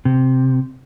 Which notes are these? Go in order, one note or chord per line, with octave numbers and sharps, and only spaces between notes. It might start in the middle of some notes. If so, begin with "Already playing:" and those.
C3